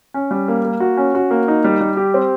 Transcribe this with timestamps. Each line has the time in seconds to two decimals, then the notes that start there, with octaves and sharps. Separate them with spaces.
0.14 C#4
0.31 G3
0.48 A#3
0.65 A#3
0.80 F#4
0.97 C#4
1.15 F#4
1.31 A#3
1.48 D#4
1.64 G3
1.81 G3
1.97 G4
2.14 C4